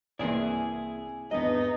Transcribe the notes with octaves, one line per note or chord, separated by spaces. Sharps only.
C2 E3 A#3 C4 E4 G#4 D5 D#6
G#1 E2 G2 B3 D#4 D#5